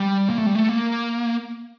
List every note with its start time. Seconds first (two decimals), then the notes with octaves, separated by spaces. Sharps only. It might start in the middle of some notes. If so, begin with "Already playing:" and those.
Already playing: G3
0.30 A#3
0.38 A3
0.46 G3
0.55 A3
0.69 A#3